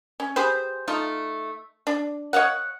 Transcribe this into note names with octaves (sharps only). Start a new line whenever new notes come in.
C#4
G4 G#4 B4 C5
A3 D#4 F4
D4
C#5 D#5 F5 F#5